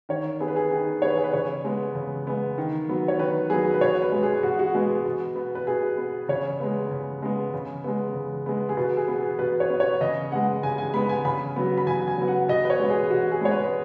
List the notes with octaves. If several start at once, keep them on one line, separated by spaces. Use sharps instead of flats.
D#3 C#5
B3 G#4
B4
G#4
D#3 G#4
B3 C#5
B4
G#4
B4
C#3 C#5
G#3 B3
C#3
G#3 B3
D#3
F#3 B3
C#5
D#3 B4
F#3 B3 G#4
B4
B2 C#5
B4
G#3 B3
G#4
B2 F#4
F#4
G#3 B3
B2
B3
B4
B2 G#4
B3
C#3 C#5
G#3 B3
C#3
G#3 B3
C#3
G#3 B3
C#3
G#3 B3
G#4
B2 B4
G#4
B3
G#4
B2 B4
C#5
B3
C#5
C#3 D#5
G#3 B3 F#5
C#3 G#5
G#5
G#3 B3 B5
G#5
C#3 B5
F#3 B3
B5
C#3 G#5
G#5
F#3 B3
F#5
B2 D#5
B4
C#5
G#3 B3
G#4
B2 F#4
G#4
G#3 B3 C#5
B4